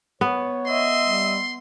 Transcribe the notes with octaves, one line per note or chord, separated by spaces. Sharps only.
B3 C#5
D#5 E5 C6
G3